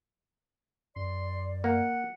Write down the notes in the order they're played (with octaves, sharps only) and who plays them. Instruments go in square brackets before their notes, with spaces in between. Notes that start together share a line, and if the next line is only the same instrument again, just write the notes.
[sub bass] F#2 [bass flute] D5 [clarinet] C6
[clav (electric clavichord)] A#3 [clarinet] F#5